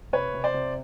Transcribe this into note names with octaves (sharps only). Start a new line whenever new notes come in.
C3 B4 C#5
C3
C5 D5
C3